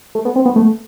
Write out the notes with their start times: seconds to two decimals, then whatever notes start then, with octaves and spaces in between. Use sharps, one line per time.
0.15 A3
0.25 B3
0.36 C4
0.45 B3
0.56 A3